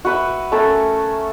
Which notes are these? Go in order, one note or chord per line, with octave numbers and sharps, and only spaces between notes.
F#4 B4 E5
A3 C#4 A4 A#4